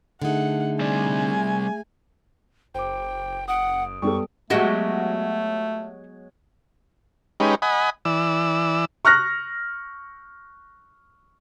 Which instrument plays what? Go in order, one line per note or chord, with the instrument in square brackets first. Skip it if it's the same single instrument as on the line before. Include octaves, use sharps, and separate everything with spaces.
[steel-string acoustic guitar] D3 D#4 [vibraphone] A3 G#4 E5 [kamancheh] F#5
[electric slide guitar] G3 C4 D5 [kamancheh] G#5
[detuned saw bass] F#1 [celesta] C5 D6 [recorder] G5
[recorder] F#5 [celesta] D#6 D7
[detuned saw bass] F#2 [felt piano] G3 B3 A4 [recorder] C#6
[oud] F#3 G#3 B3 [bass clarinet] A3 [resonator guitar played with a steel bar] F#4 G4 D#5
[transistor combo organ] G#3 C#4 D#4 G4 B4
D#5 F#5 G#5 B5
E3 D5 E6
[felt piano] C#6 F6 F#6 A#6